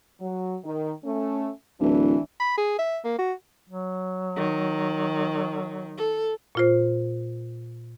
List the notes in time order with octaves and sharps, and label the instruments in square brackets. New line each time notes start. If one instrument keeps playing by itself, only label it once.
[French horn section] F#3
D#3
A3 C#4
[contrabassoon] D1 [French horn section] E3 D4
[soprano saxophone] B5
G#4
E5
A#3
F#4
[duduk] F#3
[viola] D#3
A4
[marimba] A#2 F4 C5